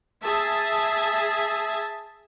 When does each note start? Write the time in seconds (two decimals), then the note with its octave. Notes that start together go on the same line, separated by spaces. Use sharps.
0.22 G#4 E5 A5